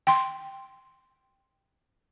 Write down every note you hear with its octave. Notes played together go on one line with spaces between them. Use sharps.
G5 C6